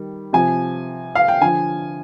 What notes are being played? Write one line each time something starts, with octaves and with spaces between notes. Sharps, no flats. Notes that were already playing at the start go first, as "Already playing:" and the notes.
Already playing: D#3 G3
C3 F3 G#5
F5
G5
D3 F3 G#5